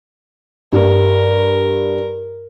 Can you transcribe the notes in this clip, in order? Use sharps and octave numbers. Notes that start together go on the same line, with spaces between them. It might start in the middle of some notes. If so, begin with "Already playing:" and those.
G2 A#4